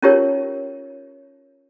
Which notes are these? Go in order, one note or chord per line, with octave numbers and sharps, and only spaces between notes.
C#4 D#4 F4 G4 A#4 C#5